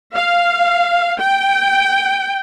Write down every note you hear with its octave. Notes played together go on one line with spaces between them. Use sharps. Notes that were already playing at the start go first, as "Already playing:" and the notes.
F5
G5